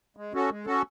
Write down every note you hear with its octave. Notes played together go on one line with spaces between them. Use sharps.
G#3
C#4 F#4 A4
G#3
C#4 F#4 A4